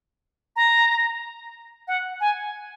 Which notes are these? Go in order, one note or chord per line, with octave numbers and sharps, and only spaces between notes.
A#5
F#5
G#5